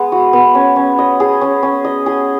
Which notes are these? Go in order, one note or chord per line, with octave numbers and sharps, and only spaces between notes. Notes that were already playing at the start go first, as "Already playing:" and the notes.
Already playing: G#3 B3
F#4
B3
C#4
C#4
D#5
G#4
C#4
C#4
D#5
G#4